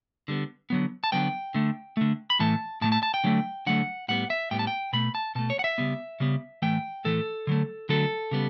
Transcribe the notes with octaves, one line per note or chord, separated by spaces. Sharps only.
D3 G3 B3
D3 F#3 B3
A5
D3 F#3 B3 G5
D3 A3
D3 A3
B5
A2 E3 A3 A5
A2 E3 A3 A5
A5
A5
G5
D3 F#3 A3
D3 F#3 A3 F#5
A2 G3 B3 F#5
E5
A2 G3 B3 G5
A5
G5
B2 A3 B5
A5
B2 A3 A5
C#5
F#5
E5
C#3 G3 B3
C#3 G3 B3
A2 E3 A3 G5
A2 E3 A3 A4
D3 F#3 A3
D3 F#3 A3 A4
C#3 G3 B3